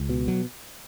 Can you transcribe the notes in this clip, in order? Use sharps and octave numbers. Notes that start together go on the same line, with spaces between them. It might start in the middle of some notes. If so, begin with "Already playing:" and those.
Already playing: C#2
B2
F#3